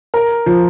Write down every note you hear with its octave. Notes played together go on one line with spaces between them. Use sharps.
A#4
F3